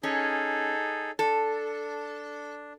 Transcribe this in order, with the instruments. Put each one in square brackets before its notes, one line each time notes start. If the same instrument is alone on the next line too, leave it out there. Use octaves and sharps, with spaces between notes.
[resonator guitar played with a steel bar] C#4 [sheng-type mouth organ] D#4 G#4 A4
[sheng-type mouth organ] D4 [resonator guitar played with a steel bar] A4